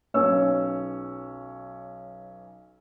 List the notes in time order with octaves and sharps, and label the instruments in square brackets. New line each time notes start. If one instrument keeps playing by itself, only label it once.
[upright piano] B1 C#4 C#5 E6